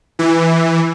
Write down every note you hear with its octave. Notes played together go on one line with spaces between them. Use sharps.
E3